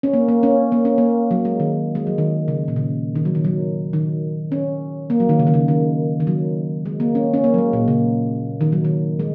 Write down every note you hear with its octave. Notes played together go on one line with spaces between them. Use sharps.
C#4
A#3
A#3
C#4
A#3
C#4
A#3
F#3
G#3
D#3
G#3
F#3
D#3
C#3
A#2
C#3
D#3
F#3
D#3
F#3
D#3
C#4
A#3
F#3
D#3
C#3
D#3
C#3
D#3
D#3
F#3
G#3
A#3
C#4
C#4
A#3
F#3
G#3
A#2
C#3
D#3
F#3
D#3
G#3